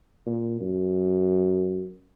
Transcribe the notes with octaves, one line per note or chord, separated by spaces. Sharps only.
A#2
F#2